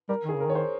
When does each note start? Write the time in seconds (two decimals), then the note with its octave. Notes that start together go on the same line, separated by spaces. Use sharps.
0.09 G3 A#4
0.24 D#3 G#4
0.36 C#3 A#4
0.46 D#3 C#5
0.55 C5